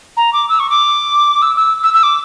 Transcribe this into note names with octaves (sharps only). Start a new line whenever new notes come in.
A#5
D6
E6
C#6
D6
E6
E6
E6
E6
D6